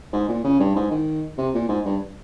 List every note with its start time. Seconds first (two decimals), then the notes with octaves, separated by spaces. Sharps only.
0.13 G#2
0.29 A#2
0.44 C#3
0.60 G2
0.76 G#2
0.91 D#3
1.38 C3
1.54 A#2
1.69 G#2
1.85 G2